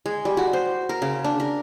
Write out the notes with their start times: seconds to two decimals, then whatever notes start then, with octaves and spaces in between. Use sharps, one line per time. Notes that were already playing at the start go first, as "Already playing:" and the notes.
0.06 G#3
0.25 G3
0.37 F#4
0.53 C5
0.89 A#4
1.02 C#3
1.24 D4
1.40 A#4